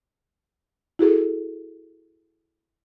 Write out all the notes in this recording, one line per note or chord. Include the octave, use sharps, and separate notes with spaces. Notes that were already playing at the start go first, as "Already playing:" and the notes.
E4 F#4 G#4 A4